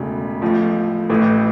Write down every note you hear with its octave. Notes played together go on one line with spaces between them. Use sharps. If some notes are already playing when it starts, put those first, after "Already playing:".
Already playing: E1 D2 C#3
A1 A2 F3
A1 A2 E3